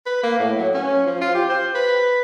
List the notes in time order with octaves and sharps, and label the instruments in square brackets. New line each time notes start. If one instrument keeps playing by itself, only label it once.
[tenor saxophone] B4
A#3
A2
F#3
C#4
F3
F4
G4
C5
B4